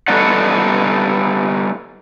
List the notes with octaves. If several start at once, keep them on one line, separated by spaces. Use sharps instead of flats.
G3 B3 D#4 A4 D5 F#5